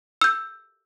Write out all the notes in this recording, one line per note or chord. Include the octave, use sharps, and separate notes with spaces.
E6 G6